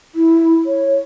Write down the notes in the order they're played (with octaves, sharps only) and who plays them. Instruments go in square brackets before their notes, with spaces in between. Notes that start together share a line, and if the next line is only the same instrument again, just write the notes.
[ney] E4
C#5